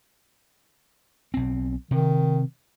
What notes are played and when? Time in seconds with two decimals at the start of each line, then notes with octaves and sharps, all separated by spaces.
1.34 B1 C4
1.91 C3 D#3